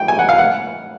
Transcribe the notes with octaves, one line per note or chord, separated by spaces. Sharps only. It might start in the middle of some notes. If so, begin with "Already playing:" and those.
Already playing: G5
G#5
F#5
F5
F#5